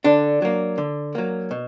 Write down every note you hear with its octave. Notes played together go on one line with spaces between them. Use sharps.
D3 D4
F#3 A#3
D3
F#3 A#3
B2